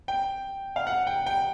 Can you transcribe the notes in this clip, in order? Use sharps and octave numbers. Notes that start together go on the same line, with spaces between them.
G5
F5
F#5
G5
G5